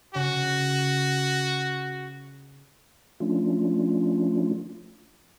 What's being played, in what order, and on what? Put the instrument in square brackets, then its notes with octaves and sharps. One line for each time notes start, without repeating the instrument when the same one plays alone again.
[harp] C#3 [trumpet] F#4
[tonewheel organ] F3 A3 C#4 D4 F4